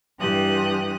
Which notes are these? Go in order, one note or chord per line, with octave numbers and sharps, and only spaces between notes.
G2 E3 G4 D#6 F#6